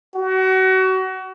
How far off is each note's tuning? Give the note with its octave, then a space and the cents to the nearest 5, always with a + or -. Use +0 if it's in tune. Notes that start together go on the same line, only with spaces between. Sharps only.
F#4 +30